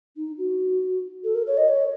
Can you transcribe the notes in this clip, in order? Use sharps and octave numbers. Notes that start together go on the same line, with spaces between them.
D#4
F#4
A4
A#4
C#5
D#5
C#5